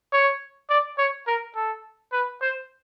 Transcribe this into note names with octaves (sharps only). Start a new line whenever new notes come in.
C#5
D5
C#5
A#4
A4
B4
C5